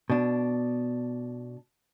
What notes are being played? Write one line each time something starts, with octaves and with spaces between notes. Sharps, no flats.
B2 D4